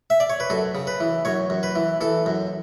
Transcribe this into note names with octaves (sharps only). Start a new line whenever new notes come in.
E5
D5
C#5
B4
F#2 A4
C#3
B4
E3
F#2 C#5
F#2
B4
E3
E3 A4
F#2